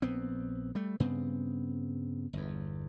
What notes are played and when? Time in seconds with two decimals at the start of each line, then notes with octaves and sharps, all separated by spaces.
0.02 A#1 B3 C4
0.75 G3 A3
1.00 G2 C#3 B3 C4
2.33 G1 E2